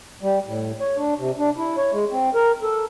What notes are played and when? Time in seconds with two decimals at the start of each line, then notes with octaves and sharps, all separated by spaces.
0.22 G3
0.47 A2
0.80 C#5
0.97 D4
1.19 C3
1.38 D4
1.57 E4
1.77 C#5
1.92 G#3
2.11 C4
2.35 A#4
2.62 A4